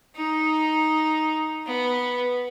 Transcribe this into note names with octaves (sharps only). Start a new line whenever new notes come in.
D#4
B3